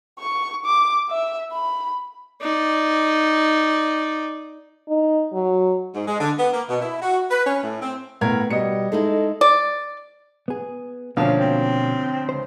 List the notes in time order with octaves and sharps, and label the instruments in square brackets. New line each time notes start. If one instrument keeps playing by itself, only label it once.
[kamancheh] C#6
D6
E5
B5
[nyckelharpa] D#4 D5
[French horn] D#4
F#3
[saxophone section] G#2
G#3
D3
B3
A#3
B2
E4
F#4
B4
C#4
A2
C4
[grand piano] A2 A#4 G#6 [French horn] B3 [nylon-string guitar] F5
[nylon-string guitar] B2 [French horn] G3 [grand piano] D#5 C#7
[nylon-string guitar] G#3 D#4 E4 [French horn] A4
[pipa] D5
[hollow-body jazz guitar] B3 G#4
[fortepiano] D2 F3 C#4 [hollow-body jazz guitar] B2 A#3 D4 [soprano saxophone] F5
[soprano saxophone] C4
[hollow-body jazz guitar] C#2 C5